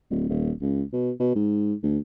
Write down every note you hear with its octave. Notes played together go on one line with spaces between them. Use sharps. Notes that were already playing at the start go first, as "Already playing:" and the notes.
D1
D#1
C#2
B2
B2
G#2
D2